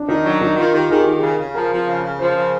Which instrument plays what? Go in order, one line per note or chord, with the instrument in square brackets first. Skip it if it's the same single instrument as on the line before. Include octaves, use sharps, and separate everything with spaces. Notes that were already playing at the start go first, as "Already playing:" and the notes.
Already playing: [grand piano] D4
[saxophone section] D#3 [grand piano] D#4
[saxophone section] F#3 [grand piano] D4
[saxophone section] D#3 [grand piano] D#4
[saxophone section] D#3 [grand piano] F4
[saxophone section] D#3 [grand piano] G4
[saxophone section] D#3 [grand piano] G#4
[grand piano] G4
[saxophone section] D#3
[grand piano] G#4
[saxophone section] C#3
C#3
[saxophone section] F3 [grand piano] A#4
[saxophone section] F3
C#3
C#3
[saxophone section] F3 [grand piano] C5
[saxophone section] C#3